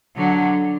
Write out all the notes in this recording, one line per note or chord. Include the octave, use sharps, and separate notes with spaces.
D3 F#3